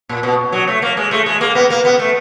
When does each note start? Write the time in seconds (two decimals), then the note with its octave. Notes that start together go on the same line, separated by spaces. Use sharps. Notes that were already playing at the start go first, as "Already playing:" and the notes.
0.09 A#2
0.23 B2
0.52 F#3
0.68 A3
0.82 A#3
0.97 G#3
1.11 A3
1.26 G#3
1.41 A#3
1.55 B3
1.70 A#3
1.85 B3
1.99 A3